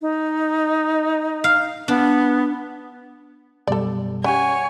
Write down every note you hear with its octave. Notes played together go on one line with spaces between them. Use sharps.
D#4
F5
B3 D4
F#2 B2 G3 A4 D5
C#4 G4 C#5 F#5 G#5